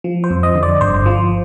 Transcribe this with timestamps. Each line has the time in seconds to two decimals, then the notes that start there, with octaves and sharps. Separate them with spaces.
0.04 F3
0.24 C5
0.31 F2
0.43 D#5
0.55 D3
0.63 D5
0.81 G1 C5
1.06 F3